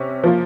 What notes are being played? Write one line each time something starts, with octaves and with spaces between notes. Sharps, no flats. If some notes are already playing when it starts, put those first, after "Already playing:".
Already playing: C3 C#4
F3 A#3 F4